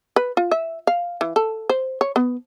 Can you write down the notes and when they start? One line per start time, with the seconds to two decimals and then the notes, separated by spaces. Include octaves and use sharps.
0.16 B4
0.37 F4
0.51 E5
0.87 F5
1.21 E3
1.36 A4
1.69 C5
2.01 C#5
2.16 B3